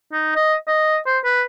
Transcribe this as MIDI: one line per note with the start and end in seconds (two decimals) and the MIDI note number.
0.12 0.33 63
0.35 0.55 75
0.68 0.98 75
1.06 1.18 72
1.24 1.42 71